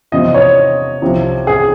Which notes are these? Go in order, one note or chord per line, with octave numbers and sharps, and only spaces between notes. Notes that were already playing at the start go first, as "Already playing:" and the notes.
E2 C3 F3 D#5
C#5
C2 C3 F3
G#4